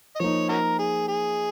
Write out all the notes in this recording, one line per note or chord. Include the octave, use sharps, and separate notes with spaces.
D#5
F3 A#3 D#4 C#5
C#4 F#4 A#4
G#4
G#4